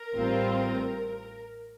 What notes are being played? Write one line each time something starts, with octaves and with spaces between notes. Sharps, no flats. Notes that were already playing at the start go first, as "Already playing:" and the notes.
Already playing: A#4
A1 A2 G3 C4 F4